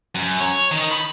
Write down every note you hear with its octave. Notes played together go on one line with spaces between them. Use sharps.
F#2
C#5
D#3
B5